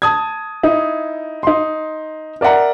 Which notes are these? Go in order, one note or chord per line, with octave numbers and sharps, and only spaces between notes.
A5 D#6 G#6
D#4 E4
D#4 C6
A#4 D5 E5 F#5 A#5